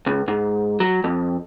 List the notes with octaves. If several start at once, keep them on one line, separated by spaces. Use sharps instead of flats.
C#2
G#2
F#3
F2